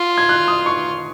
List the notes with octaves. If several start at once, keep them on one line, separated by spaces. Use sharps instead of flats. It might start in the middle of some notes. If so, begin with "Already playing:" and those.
Already playing: F4
G#6
F#6
D#6
C#6